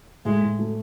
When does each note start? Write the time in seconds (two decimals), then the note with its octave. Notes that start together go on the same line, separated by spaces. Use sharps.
0.25 A2 G#3
0.42 A2
0.59 A3